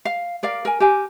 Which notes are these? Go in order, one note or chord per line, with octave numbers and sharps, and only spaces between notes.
F5
A#4 D5 F5
A#4 G#5
G4 A#4 G#5